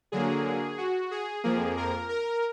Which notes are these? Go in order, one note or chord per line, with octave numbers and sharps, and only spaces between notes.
D3 F#3 A#3 G#4
F#4
G#4
F2 F3 A#3 G#4
A#4
A#4